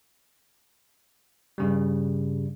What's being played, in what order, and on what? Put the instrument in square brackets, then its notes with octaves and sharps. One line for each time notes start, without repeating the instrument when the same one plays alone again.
[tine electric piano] G2 C#3 G3